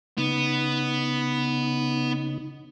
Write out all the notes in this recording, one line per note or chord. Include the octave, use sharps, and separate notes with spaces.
C#3 B3 D#4